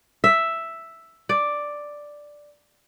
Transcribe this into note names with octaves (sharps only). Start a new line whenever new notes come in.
E5
D5